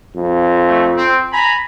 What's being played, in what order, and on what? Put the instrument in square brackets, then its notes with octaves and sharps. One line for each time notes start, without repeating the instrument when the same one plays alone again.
[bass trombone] F2
[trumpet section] A3
C4
G#5 A#5 B5